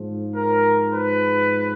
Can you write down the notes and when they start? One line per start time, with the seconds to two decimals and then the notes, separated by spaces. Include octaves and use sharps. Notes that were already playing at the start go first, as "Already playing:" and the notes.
Already playing: G#2 F3
0.36 A#4
0.93 B4